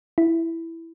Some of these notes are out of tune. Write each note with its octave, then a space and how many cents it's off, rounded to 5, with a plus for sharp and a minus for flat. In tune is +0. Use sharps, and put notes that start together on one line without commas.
E4 +0